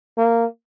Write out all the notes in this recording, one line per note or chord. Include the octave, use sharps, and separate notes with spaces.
A#3